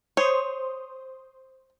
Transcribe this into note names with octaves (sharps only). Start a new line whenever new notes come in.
C5 C#5 C6 D#6